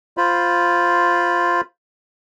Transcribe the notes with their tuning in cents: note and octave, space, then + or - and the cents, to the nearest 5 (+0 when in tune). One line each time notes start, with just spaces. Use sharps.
F4 +0 C5 +0 B5 -5